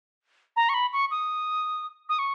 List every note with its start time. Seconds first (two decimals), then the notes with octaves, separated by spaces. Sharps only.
0.56 A#5
0.69 C#6
0.74 B5
0.93 C#6
1.11 D#6
2.09 D#6
2.19 C#6